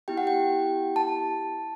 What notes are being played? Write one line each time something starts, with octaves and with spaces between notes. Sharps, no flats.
B3 E4 G4 G5
F#5
G5
A5